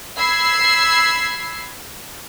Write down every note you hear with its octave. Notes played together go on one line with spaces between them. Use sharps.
B5 E6 G#6 C7